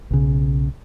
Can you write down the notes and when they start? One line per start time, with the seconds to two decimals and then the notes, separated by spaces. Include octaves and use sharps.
0.11 B1 C#3